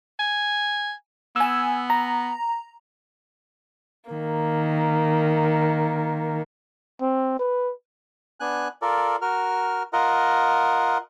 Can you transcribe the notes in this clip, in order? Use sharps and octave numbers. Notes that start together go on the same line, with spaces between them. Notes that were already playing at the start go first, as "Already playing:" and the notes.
G#5
B3 G#5 E6
A#5
D#3 A#3
C4
B4
B3 D4 G#5 F#6
F4 A4 A#4 D5
F#4 A#4 F6
F4 A#4 D#5 F#5